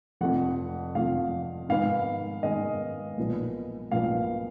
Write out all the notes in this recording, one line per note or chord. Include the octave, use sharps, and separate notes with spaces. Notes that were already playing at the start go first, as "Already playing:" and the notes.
F1 F2 F3 F#5
F1 F2 F3 F5
G#2 D#3 G#3 B3 F5
G#2 D#3 G#3 B3 D#5
B1 A#2 F3 G#3 B3
B1 A#2 F3 G#3 B3 F5